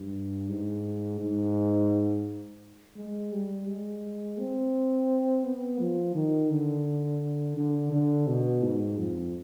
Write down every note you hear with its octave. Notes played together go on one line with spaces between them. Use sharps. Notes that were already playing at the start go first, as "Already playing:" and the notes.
Already playing: G2
G#2
G#2
G#3
G3
G#3
C4
B3
F3
D#3
D3
D3
D3
B2
G#2
F2